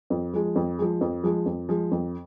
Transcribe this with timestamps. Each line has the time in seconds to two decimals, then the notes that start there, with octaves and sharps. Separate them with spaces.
0.10 F2
0.33 F3 G#3
0.56 F2
0.79 F3 G#3
1.01 F2
1.24 F3 G#3
1.46 F2
1.69 F3 G#3
1.91 F2